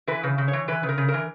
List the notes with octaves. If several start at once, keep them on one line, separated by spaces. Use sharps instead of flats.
E3 B4
C#3
C#3
C#5
E3
E3 B4
C#3
A#4
C#3
A#4
E3